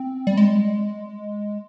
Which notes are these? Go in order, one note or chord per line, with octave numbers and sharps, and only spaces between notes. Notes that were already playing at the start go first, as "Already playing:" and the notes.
Already playing: C4
G3
G#3